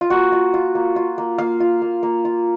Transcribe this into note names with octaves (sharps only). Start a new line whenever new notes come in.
F4
A#3 F#4
F4
F4
A#3
F4
A#3
A#3 F5
F4
A#3
A#3
F4